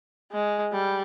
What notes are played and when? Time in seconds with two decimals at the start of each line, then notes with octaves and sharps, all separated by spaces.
0.32 G#3
0.73 G3